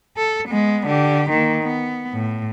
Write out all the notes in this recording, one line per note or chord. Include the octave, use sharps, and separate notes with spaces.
A4
G#3 B3
D3 G4
D#3 A#3
B3
A2